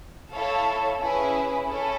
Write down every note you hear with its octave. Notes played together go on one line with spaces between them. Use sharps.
E4 A4 C#5 F5
C#4 E4 G#4 B4
C#4 E4 A4